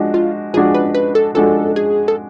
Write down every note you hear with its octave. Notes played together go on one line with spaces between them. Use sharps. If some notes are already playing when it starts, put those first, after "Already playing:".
Already playing: F3 G#3 D4 F#4
F4
F3 G#3 D4 F#4 G#4
B4
B4
A4
F3 G#3 D4 F#4 A4
G#4
A4